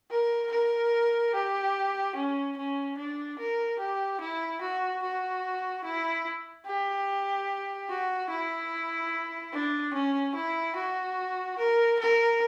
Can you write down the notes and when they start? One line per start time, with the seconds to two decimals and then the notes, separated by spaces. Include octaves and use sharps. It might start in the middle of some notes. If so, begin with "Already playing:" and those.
0.11 A#4
0.51 A#4
1.34 G4
2.15 C#4
2.57 C#4
2.97 D4
3.39 A#4
3.79 G4
4.20 E4
4.61 F#4
5.02 F#4
5.84 E4
6.66 G4
7.89 F#4
8.30 E4
9.53 D4
9.93 C#4
10.35 E4
10.75 F#4
11.58 A#4
11.99 A#4